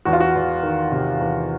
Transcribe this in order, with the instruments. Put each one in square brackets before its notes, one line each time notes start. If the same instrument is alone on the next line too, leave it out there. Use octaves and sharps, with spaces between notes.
[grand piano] E2 F#4
F4
F#4
E2
D#3
C3
E2